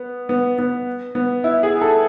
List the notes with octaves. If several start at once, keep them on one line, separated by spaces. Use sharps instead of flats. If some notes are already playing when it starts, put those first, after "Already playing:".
Already playing: B3
B3
B3
B3
E4
G#4
A4